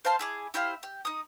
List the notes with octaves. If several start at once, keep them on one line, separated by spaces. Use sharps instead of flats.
C5 F5 A5 C6
E4 G#4 D6
E4 G4 C5 F5
G4
D#4 D#6